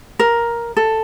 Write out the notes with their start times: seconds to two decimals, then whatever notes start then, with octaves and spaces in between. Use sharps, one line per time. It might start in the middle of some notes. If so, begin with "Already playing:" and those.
0.19 A#4
0.77 A4